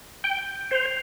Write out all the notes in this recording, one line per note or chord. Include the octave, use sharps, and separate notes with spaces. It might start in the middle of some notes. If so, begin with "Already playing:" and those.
G5 G6
C5 C7 F7